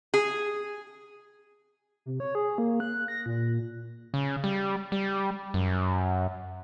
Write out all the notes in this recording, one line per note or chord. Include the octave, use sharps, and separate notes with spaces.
G#4
C3
C#5
G#4
A#3
F#6
A#6
A#2
C#3
G3
G3
F#2